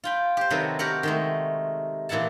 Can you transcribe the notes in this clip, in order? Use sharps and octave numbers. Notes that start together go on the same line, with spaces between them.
F4 G5 B5
G4 C5
C3 D#3 F#3 A4 B4
F#4 G4 A#4 F#5
D#3 G#3 A3
A#2 E3 E4 F#5 A5